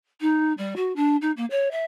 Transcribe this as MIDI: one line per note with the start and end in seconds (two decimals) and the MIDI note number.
0.21 0.53 63
0.58 0.74 55
0.76 0.93 66
0.96 1.16 62
1.21 1.31 63
1.37 1.45 58
1.50 1.71 73
1.71 1.84 76